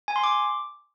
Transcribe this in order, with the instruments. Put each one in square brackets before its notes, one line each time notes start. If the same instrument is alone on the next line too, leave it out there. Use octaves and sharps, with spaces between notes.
[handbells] G#5
C6
D6